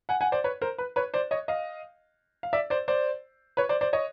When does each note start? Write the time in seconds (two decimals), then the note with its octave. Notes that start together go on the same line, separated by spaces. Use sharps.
0.09 F#5 G#5
0.21 F#5 G#5
0.32 C5 D5
0.44 B4 C#5
0.62 A#4 C5
0.78 B4
0.96 B4 C#5
1.14 C5 D5
1.31 C#5 D#5
1.48 D#5 F5
2.43 F5
2.53 D5 E5
2.70 C5 D5
2.88 C5 D5
3.57 B4 C#5
3.69 C5 D5
3.81 C5 D5
3.93 C#5 D#5